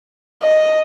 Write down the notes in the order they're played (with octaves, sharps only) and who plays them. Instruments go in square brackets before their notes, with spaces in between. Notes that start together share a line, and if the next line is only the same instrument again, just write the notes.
[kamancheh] D#5